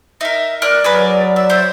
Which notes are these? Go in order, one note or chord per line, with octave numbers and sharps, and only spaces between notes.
D#4 A#4 E5
A#4 D5 F6 F#6
F#3 G#4 A#4 B4
D5 E5
C5 E5